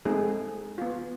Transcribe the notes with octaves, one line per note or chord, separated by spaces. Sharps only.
G#3 A3 C4 D#4 G#4
B3 F4